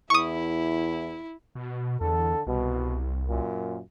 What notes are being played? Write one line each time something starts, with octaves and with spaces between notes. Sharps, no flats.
E2 E4 C#6 D#6
B2
E2 D3 A4
C2 B2
F#2 A#2